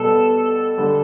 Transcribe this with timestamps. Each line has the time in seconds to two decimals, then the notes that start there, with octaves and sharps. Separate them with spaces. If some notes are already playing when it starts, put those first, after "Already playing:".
Already playing: B2 G3 B3 A4
0.78 D3 G3